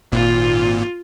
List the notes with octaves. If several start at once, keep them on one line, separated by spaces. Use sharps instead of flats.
G#1 A#2 F4